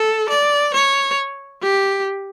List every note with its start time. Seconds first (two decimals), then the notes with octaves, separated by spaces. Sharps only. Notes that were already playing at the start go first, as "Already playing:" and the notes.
Already playing: A4
0.29 D5
0.74 C#5
1.63 G4